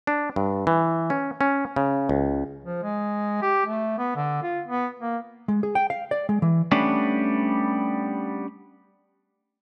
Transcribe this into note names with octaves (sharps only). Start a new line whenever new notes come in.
D4
G2
E3
C#4
C#4
C#3
C#2
F3
G#3
G4
A3
B3
D3
F4
B3
A#3
G#3
G#4
G5
F5
D5
G#3
E3
G3 A3 B3 C#4 D4